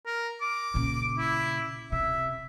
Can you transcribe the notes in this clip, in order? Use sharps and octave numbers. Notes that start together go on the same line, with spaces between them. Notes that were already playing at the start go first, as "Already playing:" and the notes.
A#4
D6
A#2 C#3
E4
C3 E5